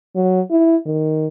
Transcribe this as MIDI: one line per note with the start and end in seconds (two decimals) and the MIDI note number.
0.15 0.41 54
0.51 0.76 64
0.86 1.26 51